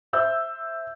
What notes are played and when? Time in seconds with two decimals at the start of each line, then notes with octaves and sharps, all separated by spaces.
0.13 C5 E5 E6 G6